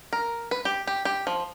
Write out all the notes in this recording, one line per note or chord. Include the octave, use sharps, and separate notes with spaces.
A#4
B4
G4
G4
G4
F3